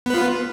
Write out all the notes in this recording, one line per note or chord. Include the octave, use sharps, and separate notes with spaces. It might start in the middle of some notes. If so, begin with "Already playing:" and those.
B3 F4 B4